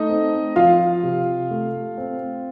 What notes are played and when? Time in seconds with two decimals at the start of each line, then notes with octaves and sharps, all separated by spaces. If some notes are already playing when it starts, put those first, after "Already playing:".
Already playing: A3 D#4 D#5
0.09 C4
0.56 F3 F4 F5
1.03 C3
1.51 A3
1.98 C4